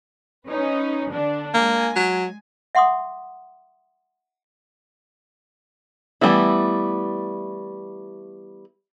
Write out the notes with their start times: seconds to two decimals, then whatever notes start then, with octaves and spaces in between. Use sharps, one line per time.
0.47 C#4 D#4 B4
1.10 D3 D4
1.54 G#3 A#3 G#5
1.96 F#3
2.75 E5 F#5 C6 D6 D#6
6.21 E3 G3 A3 B3 E4